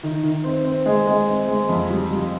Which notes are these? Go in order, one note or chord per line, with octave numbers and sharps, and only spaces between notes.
D#3
D#3
C4
C4
G#3
G#3
C4
G#3
F2
G3
G3